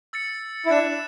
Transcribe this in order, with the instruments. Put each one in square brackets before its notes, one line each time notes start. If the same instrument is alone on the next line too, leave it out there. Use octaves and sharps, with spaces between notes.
[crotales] E6 A6 C#7
[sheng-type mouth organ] E4
[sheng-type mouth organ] D4 [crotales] F#6 A6 E7